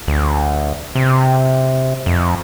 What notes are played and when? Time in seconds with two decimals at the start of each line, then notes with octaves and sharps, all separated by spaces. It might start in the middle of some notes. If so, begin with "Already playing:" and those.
0.08 D2
0.95 C3
2.06 F2